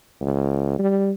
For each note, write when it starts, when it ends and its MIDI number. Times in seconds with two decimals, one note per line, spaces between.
0.21 0.75 37
0.79 1.12 55